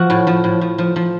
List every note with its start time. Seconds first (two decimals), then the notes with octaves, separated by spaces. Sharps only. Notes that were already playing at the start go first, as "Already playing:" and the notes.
Already playing: F3 F#4
0.10 A2
0.27 F3
0.44 A2
0.61 F3
0.78 F3
0.96 F3